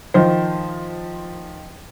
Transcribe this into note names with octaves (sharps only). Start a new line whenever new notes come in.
D#3 F3 C5